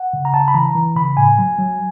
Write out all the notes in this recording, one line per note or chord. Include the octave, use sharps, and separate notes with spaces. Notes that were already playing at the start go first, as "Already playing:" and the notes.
Already playing: F#5
C#3
A#5
C#3 A5
B5
E3 A#5
E3
C#3 B5
A2 G#5
F#3
F#3